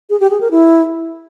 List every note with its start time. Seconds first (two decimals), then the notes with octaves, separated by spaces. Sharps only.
0.10 G#4
0.20 G4
0.30 G#4
0.41 A#4
0.51 E4